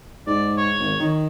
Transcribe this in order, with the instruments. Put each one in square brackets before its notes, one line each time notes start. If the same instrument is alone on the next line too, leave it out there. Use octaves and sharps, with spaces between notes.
[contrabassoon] G#2 [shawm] D5
[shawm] C#5
[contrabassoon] G#1
D#3